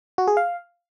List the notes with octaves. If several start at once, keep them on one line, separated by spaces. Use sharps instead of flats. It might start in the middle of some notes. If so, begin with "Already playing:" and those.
F#4
G#4
F5